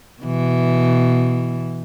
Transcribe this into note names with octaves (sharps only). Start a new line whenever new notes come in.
B2 E3